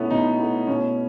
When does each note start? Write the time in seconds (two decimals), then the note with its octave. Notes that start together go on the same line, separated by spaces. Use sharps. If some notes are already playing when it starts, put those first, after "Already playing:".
Already playing: B2 A3 B3 C#4 E4
0.11 B2 D#4
0.39 A3 E4
0.67 B2 C#4